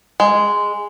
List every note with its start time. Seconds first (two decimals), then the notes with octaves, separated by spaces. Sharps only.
0.20 G#3